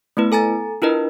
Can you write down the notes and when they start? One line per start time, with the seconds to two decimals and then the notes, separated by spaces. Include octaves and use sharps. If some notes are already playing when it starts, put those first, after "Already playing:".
0.17 A3 B3 E4 B4
0.32 A4 G#5 A#5 A6
0.82 D4 E4 F4 A#4 B4 D#5